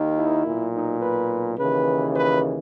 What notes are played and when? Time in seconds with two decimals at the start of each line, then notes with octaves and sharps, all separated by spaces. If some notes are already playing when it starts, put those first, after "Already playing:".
Already playing: D#2 D#3
0.17 E4
0.45 B1 A#2
0.74 D#4
1.02 B4
1.58 D#2 C#3 E3 B4
2.14 B4